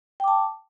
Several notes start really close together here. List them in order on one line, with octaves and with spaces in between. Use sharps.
G5 D6 A5